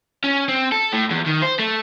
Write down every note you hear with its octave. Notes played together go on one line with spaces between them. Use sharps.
C#4
C4
A4
A2
E2
D#3
C5
A3